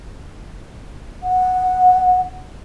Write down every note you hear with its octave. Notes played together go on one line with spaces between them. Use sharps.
F#5